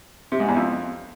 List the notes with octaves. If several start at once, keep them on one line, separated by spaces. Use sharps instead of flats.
C3
G#2
E2
F2